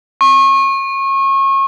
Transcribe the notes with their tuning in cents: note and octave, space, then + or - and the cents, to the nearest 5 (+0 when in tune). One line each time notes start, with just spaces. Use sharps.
C#6 -30